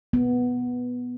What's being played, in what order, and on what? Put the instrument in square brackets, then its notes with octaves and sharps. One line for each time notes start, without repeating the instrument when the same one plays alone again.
[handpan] B3